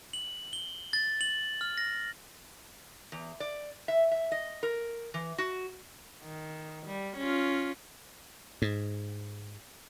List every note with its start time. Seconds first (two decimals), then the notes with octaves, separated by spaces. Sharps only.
0.13 F#7
0.53 G7
0.93 A6
1.21 F#7
1.61 F6
1.78 A#6
3.12 E2
3.40 D5
3.88 E5
4.12 E5
4.32 D#5
4.63 A#4
5.14 E3
5.38 F#4
6.23 D#3
6.87 G3
7.17 C#4 F4
8.62 G#2